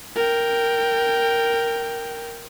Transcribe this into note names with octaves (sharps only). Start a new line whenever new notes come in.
A#4 G5